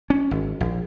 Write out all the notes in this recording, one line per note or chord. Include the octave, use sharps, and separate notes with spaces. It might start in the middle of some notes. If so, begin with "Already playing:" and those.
C#4
G#1
A#1